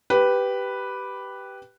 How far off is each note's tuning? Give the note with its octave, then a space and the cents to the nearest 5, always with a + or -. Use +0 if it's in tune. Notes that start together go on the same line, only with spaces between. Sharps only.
G4 -5 B4 +0